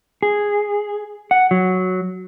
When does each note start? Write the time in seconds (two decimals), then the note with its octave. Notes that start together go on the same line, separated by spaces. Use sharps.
0.23 G#4
1.31 F#5
1.51 F#3